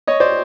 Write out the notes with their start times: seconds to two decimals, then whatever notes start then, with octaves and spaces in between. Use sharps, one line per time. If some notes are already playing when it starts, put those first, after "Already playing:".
0.07 C#5 D#5
0.20 C5 D5